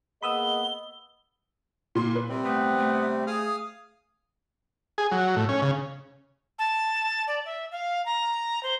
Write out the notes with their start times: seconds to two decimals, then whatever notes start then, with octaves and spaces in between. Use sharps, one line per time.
0.23 A#3 B3 G#4 D#5 B5 D#6 E6 G7
1.95 A#2 C6
2.15 B4
2.29 C3 G3 C4
2.44 A3 B3
2.78 A3
3.27 G#4 F5 D#6 F6
4.98 G#4
5.12 F#3
5.36 A2
5.49 C#4
5.62 C#3
6.59 A5
7.27 D5
7.46 E5
7.72 F5
8.06 A#5
8.63 C5